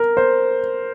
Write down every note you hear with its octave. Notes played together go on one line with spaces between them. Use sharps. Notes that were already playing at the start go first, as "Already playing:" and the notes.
Already playing: A#4
C5